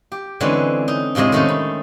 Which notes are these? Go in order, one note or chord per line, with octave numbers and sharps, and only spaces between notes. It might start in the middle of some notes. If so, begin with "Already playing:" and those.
G4
D3 E3 G#3 C4 C#4 B4
D#4
F2 A2 C3 G#3 D#5
D#3 G#3 A3 C#4 D#4 A4
B5